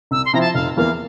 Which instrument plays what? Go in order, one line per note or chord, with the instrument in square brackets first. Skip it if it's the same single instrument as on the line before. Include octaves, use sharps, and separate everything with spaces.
[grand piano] C2 [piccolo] E6
[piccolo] C6
[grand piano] C3 F3 C4 E4 [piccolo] A#5
[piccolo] A5
[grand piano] F1 [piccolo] F5
[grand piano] E2 E3 A#3 [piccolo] F5